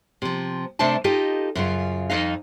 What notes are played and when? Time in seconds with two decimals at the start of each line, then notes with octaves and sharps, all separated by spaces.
0.22 C3 F3
0.79 C3 A3 D4 C5 D5 A5
1.04 D#4 F4 G4 A4 D#5
1.55 F#2 C#3 F4
2.10 F2 D#4 D#5 F5